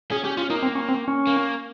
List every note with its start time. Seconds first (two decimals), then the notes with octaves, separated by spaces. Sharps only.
0.11 C#4 G#4
0.24 C#4 G4
0.37 C#4 F4
0.50 A#3 D#4
0.63 C4
0.75 C#4
0.89 C4
1.08 C#4
1.27 A#3